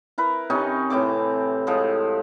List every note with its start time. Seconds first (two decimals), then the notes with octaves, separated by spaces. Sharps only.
0.18 E4 A#4 B4
0.50 C3 C#4 D#4 G#5
0.90 A2 E3 C4 D6
1.67 A2 F3 G#3